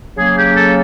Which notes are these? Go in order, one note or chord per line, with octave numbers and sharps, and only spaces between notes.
C#3 F#3 A#3 C#4 G#4
G4
A4